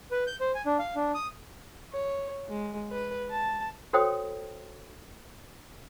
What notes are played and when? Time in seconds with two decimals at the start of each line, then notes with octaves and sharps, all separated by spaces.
0.11 B4
0.27 G6
0.40 C5
0.55 G#5
0.66 D4
0.79 F5
0.95 D4
1.14 D#6
1.92 C#5
2.48 G#3
2.91 B4
3.31 A5
3.93 F#4 A4 C5 C#5 G5 D#6